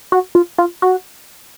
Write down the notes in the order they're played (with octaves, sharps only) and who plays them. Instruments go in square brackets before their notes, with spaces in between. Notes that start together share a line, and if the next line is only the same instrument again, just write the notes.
[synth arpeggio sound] F#4
F4
F4
F#4